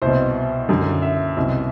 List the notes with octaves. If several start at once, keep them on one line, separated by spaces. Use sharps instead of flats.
C2 B2 C5
F#2 D3
E5
C2 B2